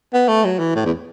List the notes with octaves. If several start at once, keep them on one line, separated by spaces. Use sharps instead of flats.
B3
A3
F#3
E3
A2
E2